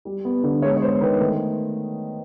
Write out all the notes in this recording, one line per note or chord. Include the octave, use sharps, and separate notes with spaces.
G3
B3
D3
G#3 C#5
C#5
B3 C5
D#3 B4
A3